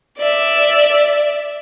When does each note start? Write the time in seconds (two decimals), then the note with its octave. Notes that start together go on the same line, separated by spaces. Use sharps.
0.18 D5 E5